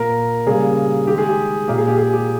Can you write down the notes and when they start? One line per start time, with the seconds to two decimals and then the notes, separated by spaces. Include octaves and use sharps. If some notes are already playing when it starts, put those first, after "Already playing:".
Already playing: A#2 A#3 A#4
0.47 C#3 G3 A#3 G#4
1.07 D#3 G#3 G4
1.18 G#4
1.29 G4
1.68 A#2 A#3 G4
1.78 G#4
1.88 G4
1.98 G#4
2.13 G4